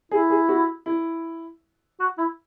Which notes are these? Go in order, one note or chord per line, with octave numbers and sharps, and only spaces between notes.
E4 G#4
G#4
F#4
E4
F#4
E4